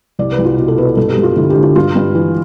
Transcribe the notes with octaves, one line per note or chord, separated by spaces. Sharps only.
C2 D5
B4
C2
F4
B2
A4
B2 B4
G2 A4
G4
G2
F4
D3 E4
G4
D3
F4
G2 F4
G2
E3